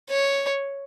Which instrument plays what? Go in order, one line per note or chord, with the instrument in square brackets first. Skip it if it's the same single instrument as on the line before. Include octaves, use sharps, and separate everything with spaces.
[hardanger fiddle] C#5